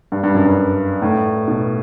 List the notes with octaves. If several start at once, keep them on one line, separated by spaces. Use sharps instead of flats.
G2
G2
F#2
G2
A2
B2